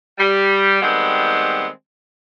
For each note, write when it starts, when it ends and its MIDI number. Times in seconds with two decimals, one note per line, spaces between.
0.18 0.79 55
0.82 1.67 51
0.82 1.67 55
0.82 1.67 56
0.82 1.67 59
0.82 1.67 60